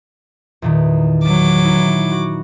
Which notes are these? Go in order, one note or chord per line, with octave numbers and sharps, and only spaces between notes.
E2 A#2 D#3
F#3 D6
D#4 E4
F#4